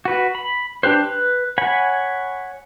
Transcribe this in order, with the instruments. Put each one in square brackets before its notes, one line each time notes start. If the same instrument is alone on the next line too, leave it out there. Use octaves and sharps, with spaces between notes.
[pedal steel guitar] F#4 B4
B5
D4 G4 B4 C5
B4
C#5 F#5 G#5 B5